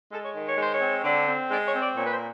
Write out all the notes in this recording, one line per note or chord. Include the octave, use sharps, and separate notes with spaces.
G#3 A4
C#5
D#3
C#5
G#3 C5
C#5
C4
D3
C4
G#3 D5
C#5
C4
D5
A#2 C#5
B4
C5